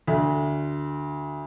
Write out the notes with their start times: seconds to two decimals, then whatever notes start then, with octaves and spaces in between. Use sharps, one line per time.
0.07 D2